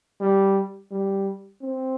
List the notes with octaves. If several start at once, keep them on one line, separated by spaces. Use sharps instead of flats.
G3
G3
C4